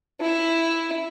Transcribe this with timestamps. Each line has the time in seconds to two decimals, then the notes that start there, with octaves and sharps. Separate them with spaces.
0.21 E4